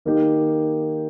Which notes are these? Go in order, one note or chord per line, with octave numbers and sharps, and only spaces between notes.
D#3 A#3 D#4 G4